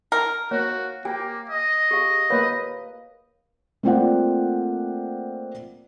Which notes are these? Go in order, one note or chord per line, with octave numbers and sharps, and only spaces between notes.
A#4
A#3 F#4 C#5
A#3 G4 G#5
D#5
G4 G#4 F5
A#3 B4 C#5 F5
A3 A#3 C4 F4 D5 F#5